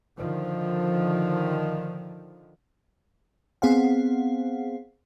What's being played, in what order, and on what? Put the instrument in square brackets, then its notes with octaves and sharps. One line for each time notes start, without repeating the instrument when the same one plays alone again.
[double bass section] D3 D#3 F3
[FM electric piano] B3 C4 G#4 C5 F5 F#5